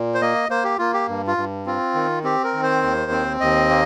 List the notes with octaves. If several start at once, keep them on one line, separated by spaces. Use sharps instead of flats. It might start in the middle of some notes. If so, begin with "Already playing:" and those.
Already playing: A#2
C5
A#3 D#5
A#3 C5
G4
A#3 F4
G4
G2
F4
G2
C4 F4
D#3
C4 G4
A#4
D#3
C5
D#2
C4
D#2 D#5
A#3